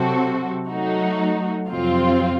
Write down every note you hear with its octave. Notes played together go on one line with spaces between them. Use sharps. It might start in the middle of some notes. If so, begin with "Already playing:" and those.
Already playing: C3 F#3 C4 F#4 A4
F#3 A3 D#4 F#4
F2 C3 F#3 C4 F4